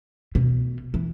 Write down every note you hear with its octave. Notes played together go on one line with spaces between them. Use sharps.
B2
E3